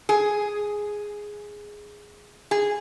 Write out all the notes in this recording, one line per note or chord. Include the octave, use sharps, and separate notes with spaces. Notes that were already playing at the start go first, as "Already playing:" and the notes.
G#4
G#4